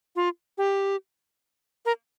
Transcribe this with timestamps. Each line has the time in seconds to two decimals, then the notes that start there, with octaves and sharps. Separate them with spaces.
0.16 F4
0.58 G4
1.86 A#4